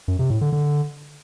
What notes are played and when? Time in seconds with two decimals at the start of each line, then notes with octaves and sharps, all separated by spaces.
0.08 F#2
0.19 C3
0.30 A2
0.41 D3
0.53 D3